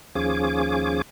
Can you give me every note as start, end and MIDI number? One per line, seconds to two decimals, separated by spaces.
0.15 1.02 39
0.15 1.02 53
0.15 1.02 61
0.15 1.02 68
0.15 1.02 86